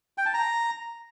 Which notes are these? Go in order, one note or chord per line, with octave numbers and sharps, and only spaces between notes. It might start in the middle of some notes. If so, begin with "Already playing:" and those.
G5
A5
A#5